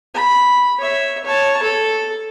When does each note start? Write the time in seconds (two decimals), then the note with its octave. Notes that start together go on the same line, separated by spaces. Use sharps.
0.14 B5
0.79 C#5 E5
1.24 C#5 A5
1.62 A4